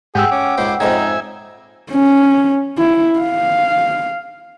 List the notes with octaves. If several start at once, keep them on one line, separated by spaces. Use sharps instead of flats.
G#2 G4 G#4 F#5 G5 E6
C#4 D6
C#2 G#2 C#3 C5
F2 G#2 C#3 D#4 E5 G#5
C#4
E4
F5